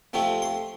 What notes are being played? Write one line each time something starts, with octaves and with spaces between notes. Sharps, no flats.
F2 C3 F3 A3 C4
C6